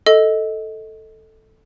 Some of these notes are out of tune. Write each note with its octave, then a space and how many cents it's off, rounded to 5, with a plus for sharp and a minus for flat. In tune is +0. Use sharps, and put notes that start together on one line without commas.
A4 +0 D#5 +15